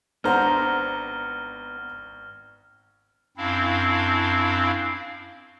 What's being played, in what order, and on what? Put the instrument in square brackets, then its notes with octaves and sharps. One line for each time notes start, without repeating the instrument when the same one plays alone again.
[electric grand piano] G#1 A#5 [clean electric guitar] B3 [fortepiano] D4 C5 F#5 [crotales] F6
[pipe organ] F#2 C4 D4 E4 F5